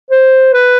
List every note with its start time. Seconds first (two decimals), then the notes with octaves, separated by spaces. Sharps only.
0.10 C5
0.53 B4